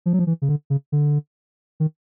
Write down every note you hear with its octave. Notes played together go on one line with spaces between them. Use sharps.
F3
F#3
F3
E3
C#3
D3
C#3
D3
D#3